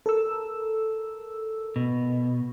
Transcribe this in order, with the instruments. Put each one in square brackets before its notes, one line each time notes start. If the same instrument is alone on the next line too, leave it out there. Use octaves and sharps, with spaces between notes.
[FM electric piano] A4 A#4 E6
[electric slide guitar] B2